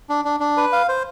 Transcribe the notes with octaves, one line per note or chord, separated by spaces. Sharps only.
D4
D4
D4
B4
F5
C5